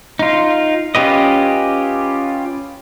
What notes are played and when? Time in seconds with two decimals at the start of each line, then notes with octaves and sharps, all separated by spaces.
0.19 D#4 F4
0.95 C#4 F4 G4 B4 D#5